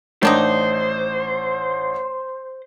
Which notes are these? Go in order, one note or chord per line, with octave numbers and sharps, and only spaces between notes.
A1 D#3 D4 D#4 C5